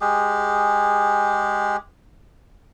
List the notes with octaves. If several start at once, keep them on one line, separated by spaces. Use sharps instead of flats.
G#3 G4 G#4